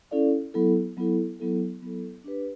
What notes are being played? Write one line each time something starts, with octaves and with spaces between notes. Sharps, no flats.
C#4 E4 A4 D5 F5
F#3 B3 E4 A4
F#3 B3 E4 A4
F#3 B3 E4 A4
F#3 B3 E4 A4
D4 G4 B4